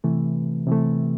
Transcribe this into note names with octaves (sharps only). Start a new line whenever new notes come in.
C3 E3 A3
C3 E3 A3